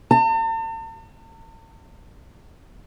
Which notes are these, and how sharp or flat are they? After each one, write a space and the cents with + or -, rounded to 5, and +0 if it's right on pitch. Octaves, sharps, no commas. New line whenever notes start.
A5 +45